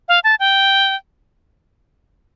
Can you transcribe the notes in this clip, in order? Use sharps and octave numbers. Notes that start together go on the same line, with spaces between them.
F5
A5
G5